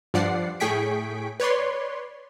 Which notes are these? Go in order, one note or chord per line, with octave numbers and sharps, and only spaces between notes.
G2 F3 D5 F#5 C7
A2 G#4 G5 C#6 B6 D7
B4 C#5 D5 C6